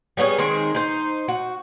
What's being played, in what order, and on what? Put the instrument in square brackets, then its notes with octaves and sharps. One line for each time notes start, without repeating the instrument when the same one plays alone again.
[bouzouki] G3 B3 C#4 G#4
D#3 G#3 C4 G#4
D#4 C5
F#4